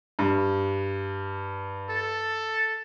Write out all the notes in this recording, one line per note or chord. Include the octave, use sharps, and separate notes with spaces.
G2
A4